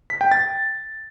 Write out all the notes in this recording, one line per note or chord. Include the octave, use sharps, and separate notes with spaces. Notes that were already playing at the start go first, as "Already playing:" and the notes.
B6
G5
A6